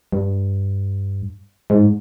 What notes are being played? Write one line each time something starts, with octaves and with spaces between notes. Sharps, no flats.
G2
G#2